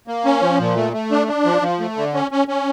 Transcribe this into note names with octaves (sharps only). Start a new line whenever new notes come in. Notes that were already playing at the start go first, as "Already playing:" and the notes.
A#3
C#4
F3
A#2
A3
A3
D4
D4
F3
F3
A3
D3
C#4
C#4
C#4